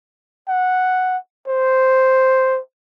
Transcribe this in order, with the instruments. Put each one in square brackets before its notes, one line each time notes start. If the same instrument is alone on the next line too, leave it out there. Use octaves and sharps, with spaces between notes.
[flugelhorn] F#5
C5